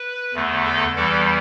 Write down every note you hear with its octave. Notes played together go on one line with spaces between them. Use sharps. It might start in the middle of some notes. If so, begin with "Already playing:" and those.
Already playing: B4
E2 D3 A3
A4
E2 E3 G3 A4